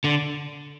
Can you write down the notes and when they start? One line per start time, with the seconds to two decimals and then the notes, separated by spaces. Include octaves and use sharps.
0.04 D3